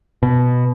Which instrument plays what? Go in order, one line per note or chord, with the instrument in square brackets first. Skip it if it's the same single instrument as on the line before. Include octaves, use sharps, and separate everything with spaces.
[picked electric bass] B2